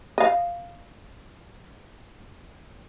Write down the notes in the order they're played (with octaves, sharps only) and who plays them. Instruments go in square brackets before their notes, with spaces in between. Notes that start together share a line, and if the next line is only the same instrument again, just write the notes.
[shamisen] D#5 F5